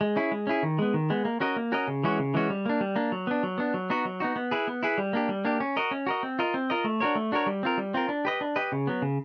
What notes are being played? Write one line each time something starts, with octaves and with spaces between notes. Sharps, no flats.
G#3
C#4 E4 G#4
G#3
C#4 E4 G#4
D#3
G#3 B3
D#3
G#3 B3
A#3
C#4 F#4 A#4 D#5
A#3
C#4 F#4 A#4 D#5
C#3
E3 G#3 C#4 F#4
C#3
E3 G#3 C#4 F#4
G3
A#3 D4
G3
A#3 D4
F#3
B3 D4
F#3
B3 D4
F#3
B3 D#4 F#4
F#3
B3 D#4 F#4
B3
E4 G#4 B4
B3
E4 G#4 B4
G3
A#3 D4 G4
G3
A#3 D4 G4
C#4
F#4 A#4 D#5
C#4
F#4 A#4 D#5
C4
F4 A#4 D#5
C4
F4 A#4 D#5
A3
D4 F#4 A#4 C#5
A3
D4 F#4 A#4 C#5
G3
C4 F4 A#4
G3
C4 F4 A#4
D4
G4 B4 D#5
D4
G4 B4 D#5
C#3
F#3 B3
C#3